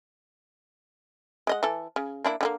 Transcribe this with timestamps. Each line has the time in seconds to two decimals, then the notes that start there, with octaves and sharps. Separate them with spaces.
1.47 G#3 D#5 F#5
1.63 E3 A4
1.96 C#3
2.24 A#3 D4 E4
2.41 D3 G3 A#3